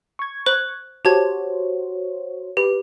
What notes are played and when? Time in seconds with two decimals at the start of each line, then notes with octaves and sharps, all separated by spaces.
0.19 C#6 G#6
0.46 C5 F#6 F#7
1.05 F#4 G4 C5 C#5 A5 G#6
2.57 G4 B4